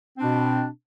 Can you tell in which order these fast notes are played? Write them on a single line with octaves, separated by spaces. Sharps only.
C4 D4 B2